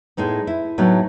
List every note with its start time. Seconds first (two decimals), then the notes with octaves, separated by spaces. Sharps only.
0.17 A2 G#3 B3 D#4
0.47 E4
0.78 A2 F#3 B3 D#4